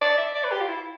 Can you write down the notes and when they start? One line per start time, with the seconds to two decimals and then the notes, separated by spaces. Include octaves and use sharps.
0.01 D5
0.17 E5
0.35 D5
0.44 B4
0.52 G4
0.61 F4
0.68 E4